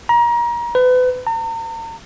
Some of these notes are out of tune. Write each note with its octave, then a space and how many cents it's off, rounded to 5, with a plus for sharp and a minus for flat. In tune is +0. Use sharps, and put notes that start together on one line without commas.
A#5 +30
B4 +35
A#5 -40